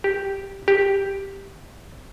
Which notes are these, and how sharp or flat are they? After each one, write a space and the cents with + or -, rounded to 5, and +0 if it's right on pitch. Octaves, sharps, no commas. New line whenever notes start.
G4 -5
G4 +0